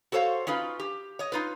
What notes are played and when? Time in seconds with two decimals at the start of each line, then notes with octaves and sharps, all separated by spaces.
0.12 F#4 A4 C5 C#5 F5
0.47 C#4 D#4 F4 B4
0.80 G4
1.19 C#5 D#5
1.32 D#4 F4 B4